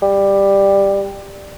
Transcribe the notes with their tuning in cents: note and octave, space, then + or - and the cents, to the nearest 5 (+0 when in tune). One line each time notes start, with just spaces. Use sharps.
G3 +10